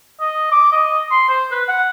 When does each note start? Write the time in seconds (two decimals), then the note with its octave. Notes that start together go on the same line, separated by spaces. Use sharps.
0.21 D#5
0.52 D6
0.72 D#5
1.11 C6
1.29 C5
1.51 B4
1.68 F#5